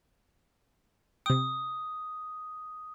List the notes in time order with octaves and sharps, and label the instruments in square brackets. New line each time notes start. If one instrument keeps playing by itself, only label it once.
[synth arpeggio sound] C3 G5 [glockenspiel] D#6